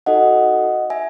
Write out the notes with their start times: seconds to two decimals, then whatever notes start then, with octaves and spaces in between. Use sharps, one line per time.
0.06 D#4 F#4 A4 D#5 F#5
0.90 E5 G#5